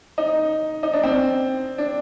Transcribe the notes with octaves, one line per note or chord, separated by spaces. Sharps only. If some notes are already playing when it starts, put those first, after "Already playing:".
D#4
D#4
D4
C4
D4